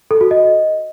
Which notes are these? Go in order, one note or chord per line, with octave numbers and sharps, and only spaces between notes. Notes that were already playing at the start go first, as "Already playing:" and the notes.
A4
F#4
D#5